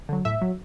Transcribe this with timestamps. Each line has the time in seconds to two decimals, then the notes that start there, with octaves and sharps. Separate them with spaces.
0.09 D3 F#3
0.25 A2 E5
0.42 F#3